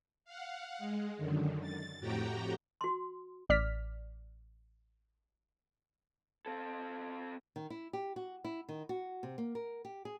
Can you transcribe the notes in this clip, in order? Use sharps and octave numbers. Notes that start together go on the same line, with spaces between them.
F5 F#5
G#3
F#2 D3 D#3
A6
F2 A2 F#4 G4 G5 A#5
F#4 C6
A1 D5 F6 B6
C4 A4
D#3
E4
G4
F#4
E4
D#3
F#4
C3
A#3
A#4
G4
G#4